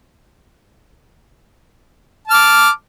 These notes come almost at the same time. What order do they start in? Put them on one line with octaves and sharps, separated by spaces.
A5 F6 D6